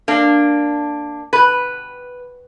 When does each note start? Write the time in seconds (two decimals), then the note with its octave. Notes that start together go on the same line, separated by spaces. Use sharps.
0.08 A#3 D4
1.33 B4